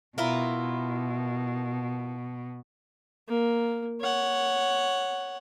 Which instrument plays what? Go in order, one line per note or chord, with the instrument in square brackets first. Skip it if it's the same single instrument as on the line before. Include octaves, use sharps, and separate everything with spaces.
[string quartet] B2 [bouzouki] E4 F4 A#4
[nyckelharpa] A#3
C#5 F#5